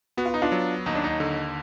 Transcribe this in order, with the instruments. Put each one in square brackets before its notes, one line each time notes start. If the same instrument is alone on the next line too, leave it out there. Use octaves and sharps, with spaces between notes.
[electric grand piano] B3 [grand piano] F#4
[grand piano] F4
D#4
D4 F4
[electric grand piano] F#3
[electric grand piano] D#2 [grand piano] D#4
[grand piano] D4
D#4
[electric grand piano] D3